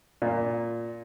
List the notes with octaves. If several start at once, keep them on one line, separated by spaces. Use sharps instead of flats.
A#2